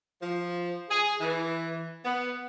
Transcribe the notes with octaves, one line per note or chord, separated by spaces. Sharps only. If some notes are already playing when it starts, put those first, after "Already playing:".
F3
G#4
E3
B3